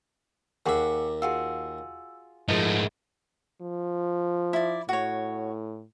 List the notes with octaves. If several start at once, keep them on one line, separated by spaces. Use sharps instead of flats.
D#2 G#4 A#4 E5 F#5 C#6 D6
F4 F#4 G#4 E6
G#2 F3 A3 G#4 A#4 D#5
F3
E4 D5
A2 F#4 C#5